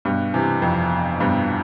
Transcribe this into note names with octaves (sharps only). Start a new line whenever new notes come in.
G2 B2
C3 E3
F2
G2 B2